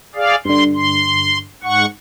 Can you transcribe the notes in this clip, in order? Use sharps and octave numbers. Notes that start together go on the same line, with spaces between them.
G#4 D5 F5
G2 D3 C6
C6
G#2 F#5 C#6